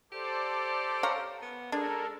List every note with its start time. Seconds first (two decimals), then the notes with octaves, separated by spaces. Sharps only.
0.12 G4 A4 C5 D5
1.03 C#5 F5 A#5
1.42 B3
1.72 G#3 D4 A4 A#4